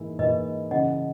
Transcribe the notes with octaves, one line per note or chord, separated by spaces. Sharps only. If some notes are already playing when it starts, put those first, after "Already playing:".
Already playing: G#2 E3 A#3 E4
G#2 E3 A#3 E4 B4 D#5
F#2 C#3 E3 D#5 F#5